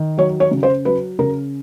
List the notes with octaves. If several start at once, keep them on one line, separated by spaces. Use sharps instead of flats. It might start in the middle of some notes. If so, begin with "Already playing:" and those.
Already playing: D#3
F#3 C#5
C#5
C#3
C5
F#3 B4
C#3 A#4